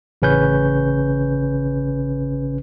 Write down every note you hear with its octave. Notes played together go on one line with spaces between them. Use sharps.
A1 C#3 C#4 B4 G6